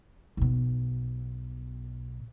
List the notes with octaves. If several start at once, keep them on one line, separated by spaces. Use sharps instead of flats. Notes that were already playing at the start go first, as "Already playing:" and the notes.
B1 B2